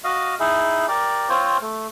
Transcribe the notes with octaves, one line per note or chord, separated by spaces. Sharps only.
F#4 D#5 F5
D#4 E4 G#4
G4 A#4 D5
C4 F4 C5 C#5
A3